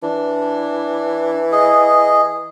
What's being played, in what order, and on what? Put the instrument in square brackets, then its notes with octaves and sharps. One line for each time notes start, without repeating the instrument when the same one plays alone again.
[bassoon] E3 [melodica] D4
[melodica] G#4 D#5